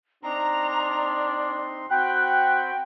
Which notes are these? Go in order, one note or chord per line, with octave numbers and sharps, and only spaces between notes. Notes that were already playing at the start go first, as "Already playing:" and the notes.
C4 D4 D#4 A#5 C6
C4 F#4 G5 B5 F#6